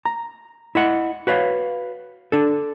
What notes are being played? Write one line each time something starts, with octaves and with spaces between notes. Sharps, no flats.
A#5
E4 D#5 F#5
F#4 B4 C#5 F5
D4 A4